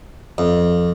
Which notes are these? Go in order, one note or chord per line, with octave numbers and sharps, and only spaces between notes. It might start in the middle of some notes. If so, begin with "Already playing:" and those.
F2